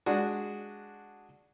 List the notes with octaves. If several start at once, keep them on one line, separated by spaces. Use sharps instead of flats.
G#3 D4 F#4